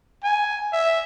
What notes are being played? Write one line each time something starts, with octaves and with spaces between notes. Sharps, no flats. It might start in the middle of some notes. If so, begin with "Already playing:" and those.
G#5
E5